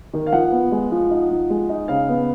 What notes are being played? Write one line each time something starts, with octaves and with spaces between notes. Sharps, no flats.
D#3
F5
F3 F#5
B3
G#3
F3
D#4
F3
G#3
D#4
C#3 F5
B3